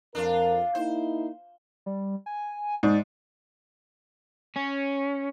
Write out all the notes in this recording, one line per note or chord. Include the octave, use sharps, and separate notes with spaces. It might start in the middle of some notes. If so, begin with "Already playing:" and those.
F2 D4 F4 A#4
A#3 D#4 E4 C5
G3
G#5
G#2 D5
C#4